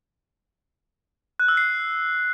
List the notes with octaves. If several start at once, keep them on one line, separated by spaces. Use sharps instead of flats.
F#6
E6
C7